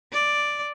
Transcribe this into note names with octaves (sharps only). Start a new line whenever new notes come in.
D5